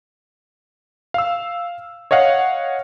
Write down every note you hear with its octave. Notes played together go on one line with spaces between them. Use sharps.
F5 E6
C#5 D#5 F5 F#5